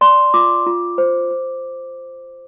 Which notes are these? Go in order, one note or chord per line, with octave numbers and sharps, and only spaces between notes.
D5 C6
F4 D6
F4
C5
C5